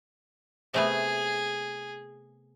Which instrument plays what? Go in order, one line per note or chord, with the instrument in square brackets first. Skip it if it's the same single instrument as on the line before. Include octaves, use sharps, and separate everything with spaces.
[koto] C3 A3 B3 [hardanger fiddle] G#4